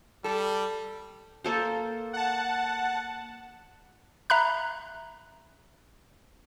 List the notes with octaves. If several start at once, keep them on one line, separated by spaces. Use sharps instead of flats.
G3 A4
A#3 A4 C5
F#5 A5
E5 A#5 B5 F#6